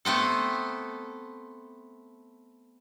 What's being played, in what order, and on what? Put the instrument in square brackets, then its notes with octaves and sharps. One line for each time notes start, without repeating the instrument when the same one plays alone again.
[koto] A3 B3 C4 A4